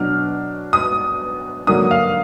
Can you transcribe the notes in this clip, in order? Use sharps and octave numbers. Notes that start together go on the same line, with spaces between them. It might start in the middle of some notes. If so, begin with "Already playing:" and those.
Already playing: B2 F#3 D4 F6
D#6
D3 F#3 A#3 D4 D#6
F5